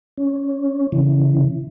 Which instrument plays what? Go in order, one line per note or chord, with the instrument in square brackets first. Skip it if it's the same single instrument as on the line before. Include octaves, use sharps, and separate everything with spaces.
[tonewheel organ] C#4
C#3 E3